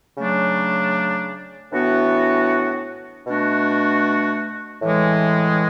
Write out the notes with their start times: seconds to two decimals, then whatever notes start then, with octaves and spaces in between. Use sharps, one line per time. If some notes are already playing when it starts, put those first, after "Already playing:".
0.17 C#3 F#3 A3 D4
1.72 A2 E3 B3 D4 F#4
3.27 B2 A3 D4 F#4
4.82 A2 E3 G#3